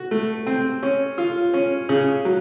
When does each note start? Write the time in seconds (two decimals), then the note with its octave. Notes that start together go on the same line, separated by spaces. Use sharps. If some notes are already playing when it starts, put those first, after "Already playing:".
Already playing: F#4
0.11 A3
0.47 C4
0.83 C#4
1.18 F4
1.54 C#4
1.89 C#3
2.25 F#3